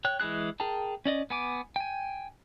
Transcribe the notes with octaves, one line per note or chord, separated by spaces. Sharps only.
C#5 G5 F#6
E3 G#3 E4 G#4 F#6
G#4 A#4 G5 A5
C#4 D5 D#5
B3 G#5 D6
G5 G#5